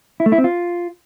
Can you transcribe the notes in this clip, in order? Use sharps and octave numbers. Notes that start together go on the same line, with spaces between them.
E4
A3
E4
C4
F4